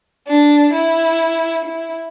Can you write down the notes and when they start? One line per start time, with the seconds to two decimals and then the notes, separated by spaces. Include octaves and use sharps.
0.27 D4
0.72 E4
1.65 E4